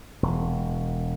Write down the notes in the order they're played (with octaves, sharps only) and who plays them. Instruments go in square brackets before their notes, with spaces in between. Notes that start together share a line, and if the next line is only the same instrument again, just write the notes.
[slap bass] E1